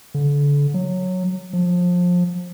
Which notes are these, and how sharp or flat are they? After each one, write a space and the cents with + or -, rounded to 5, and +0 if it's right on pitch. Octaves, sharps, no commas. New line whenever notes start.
D3 -35
F#3 -10
F3 +25